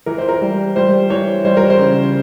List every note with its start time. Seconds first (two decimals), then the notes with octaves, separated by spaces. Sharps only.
0.06 E3 A#4
0.18 C5
0.29 A#4
0.41 G3
0.76 G3 C5
1.10 E3 C#5
1.45 G3 C5
1.57 A#4
1.70 C5
1.79 C#3